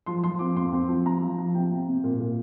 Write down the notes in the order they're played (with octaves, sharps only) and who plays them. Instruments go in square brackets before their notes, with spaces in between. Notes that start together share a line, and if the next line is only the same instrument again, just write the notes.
[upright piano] F3 C6
F3 C6
C4 D6
F2 C6
C4
F3
C3 A#5
F3
F3
C3 G5
C3
C3
A#2
A#2